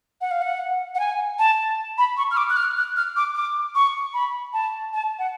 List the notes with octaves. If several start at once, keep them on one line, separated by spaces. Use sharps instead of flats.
F#5
F5
F#5
F#5
G#5
A5
B5
C#6
F6
D6
F#6
F6
F#6
F6
D6
D6
C#6
B5
A5
A5
F#5